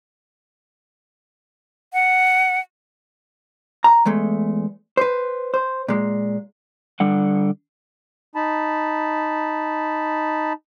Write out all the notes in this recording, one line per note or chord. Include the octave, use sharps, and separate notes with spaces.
F#5
A#5
E2 G#3 A3
B4 C5
C5
A#2 G#3
D3 G3 F#5
D#4 A5 B5